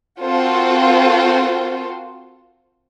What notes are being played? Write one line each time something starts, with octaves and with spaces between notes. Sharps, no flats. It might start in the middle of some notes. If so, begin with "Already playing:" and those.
C4 F4 F#4 A4 A#4 C5